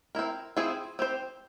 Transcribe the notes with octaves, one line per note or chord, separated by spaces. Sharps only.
C4 E4 A#4
F3 C4 E4 G#4 C5
C4 G4 C5